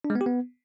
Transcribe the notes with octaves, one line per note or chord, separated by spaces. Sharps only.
D4
G#3
B3
G4
B3